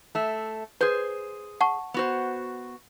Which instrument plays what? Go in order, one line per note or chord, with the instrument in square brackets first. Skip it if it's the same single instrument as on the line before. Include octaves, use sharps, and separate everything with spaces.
[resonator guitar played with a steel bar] A3 E5
[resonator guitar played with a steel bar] G#4 C5 [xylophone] B4 G6
[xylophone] F#5 A5 C#6
[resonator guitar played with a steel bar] B3 F#4 C5